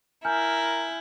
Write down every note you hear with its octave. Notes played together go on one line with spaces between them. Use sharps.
E4 A#4 G#5 F6 G6